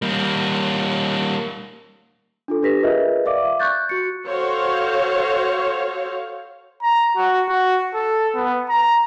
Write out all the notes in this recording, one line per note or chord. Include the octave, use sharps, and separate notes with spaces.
G3 A#3
D4 F4 A4
D4 G4 B4 A#6 B6
F4 G#4 A#4 B4 D#5 E5
D5 E5 F5 D6
C#6 F#6 G6 A6
F#4 C#7
F#4 A4 C5 C#5 F5
A#5
F#4
F#4
A4
B3
A#5